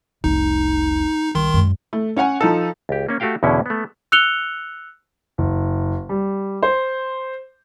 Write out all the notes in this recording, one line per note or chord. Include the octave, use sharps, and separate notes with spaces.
F1 C2 D#4
C2 D#3 C6
F#2 G#3
A3
C#4 C#5 F#5 G#5
F3 D#4 A4
C#2 G4
A#3 C#4
A3 F#4 G4 F5 G5
E2 B2 D3 C#4 E4
A3 B3
E6 F#6 C#7 F7 G7
F#1
G3
C5